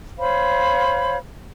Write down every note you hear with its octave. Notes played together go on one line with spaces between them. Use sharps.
C5 C#5 F5 B5